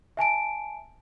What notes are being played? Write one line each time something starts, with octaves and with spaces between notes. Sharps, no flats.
E5 G#5 A5 D7